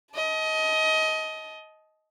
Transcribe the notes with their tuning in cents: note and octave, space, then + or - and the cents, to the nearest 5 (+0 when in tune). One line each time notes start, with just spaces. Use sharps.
D#5 +20 A5 -25